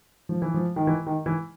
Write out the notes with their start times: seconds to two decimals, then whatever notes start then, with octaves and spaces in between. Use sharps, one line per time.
0.29 F3
0.42 E3
0.54 F3
0.76 D#3
0.87 E3
1.07 D#3
1.26 E3